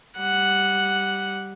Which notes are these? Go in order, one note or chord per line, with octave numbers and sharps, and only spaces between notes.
G3 F#5